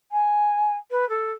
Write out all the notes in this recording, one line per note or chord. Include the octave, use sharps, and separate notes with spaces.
G#5
B4
A4